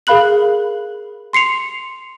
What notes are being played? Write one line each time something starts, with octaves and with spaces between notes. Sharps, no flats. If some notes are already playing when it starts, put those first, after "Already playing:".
G#4 A#4 F5 B5 F#6 F#7
C6 C7 C#7 F7